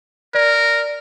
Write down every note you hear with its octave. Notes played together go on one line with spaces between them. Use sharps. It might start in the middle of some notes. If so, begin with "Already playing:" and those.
A#4 D5